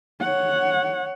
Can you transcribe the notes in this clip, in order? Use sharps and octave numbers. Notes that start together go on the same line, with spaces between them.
C#5 F#5